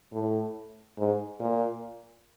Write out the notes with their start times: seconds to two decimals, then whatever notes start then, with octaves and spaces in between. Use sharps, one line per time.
0.12 A2
0.98 G#2
1.40 A#2